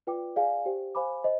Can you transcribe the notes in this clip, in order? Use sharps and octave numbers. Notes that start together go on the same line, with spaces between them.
F4 B4 D5 G5 D6
G#4 D5 F5 G#5
G4 C5 G5
C5 F5 G#5 B5 D6
C5 D#5